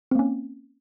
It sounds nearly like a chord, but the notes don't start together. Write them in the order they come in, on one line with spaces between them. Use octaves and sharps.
C4 A#3 C#4